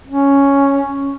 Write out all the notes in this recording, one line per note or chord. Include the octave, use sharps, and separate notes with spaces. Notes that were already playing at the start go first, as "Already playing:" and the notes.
C#4